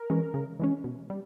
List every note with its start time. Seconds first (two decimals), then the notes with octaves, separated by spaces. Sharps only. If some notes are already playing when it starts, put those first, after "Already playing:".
Already playing: A#4
0.10 E3 G#3 C#4
0.34 C#3
0.60 E3 G#3 C#4
0.84 B2
1.10 G3